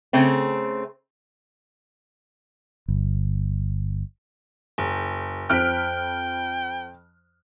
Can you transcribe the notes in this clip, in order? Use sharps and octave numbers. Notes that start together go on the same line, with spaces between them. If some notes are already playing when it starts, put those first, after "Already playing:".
C#3 A3 C4
G1
F#1
F2 C4 G5 F6 F#6 B6 D7